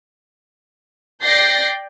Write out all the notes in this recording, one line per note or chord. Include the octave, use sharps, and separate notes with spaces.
D5 G5 G6 A6 A#6 C7